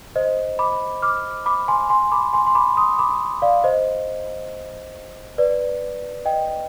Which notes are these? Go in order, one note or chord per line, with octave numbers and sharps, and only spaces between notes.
C5 D#5
B5 D6
D6 F6
B5 D6
G#5 C6
G#5 C6
B5 D6
G#5 C6
C6
B5 D6
C6 D#6
B5 D6
D5 F5
C5 D#5
B4 D5
D#5 G5